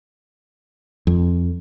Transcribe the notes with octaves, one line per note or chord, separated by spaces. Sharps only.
F2